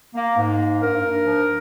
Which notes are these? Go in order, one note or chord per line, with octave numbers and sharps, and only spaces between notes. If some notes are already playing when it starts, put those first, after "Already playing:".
A#3
G#2
A#3
G2 A#4
G2
F3